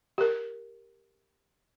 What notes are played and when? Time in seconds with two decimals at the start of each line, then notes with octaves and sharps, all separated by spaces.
0.18 G4 A#4